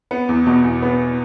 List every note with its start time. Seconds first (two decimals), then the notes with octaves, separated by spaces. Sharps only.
0.11 B3
0.29 E2
0.47 B2
0.64 E2
0.82 B3